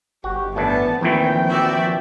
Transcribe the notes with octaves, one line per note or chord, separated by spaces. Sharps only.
G1 F#4 G4
A2 E3 B3 D4 A5
D#2 A#2 E3 F3 A3 C4 G5
F#4 D5 E5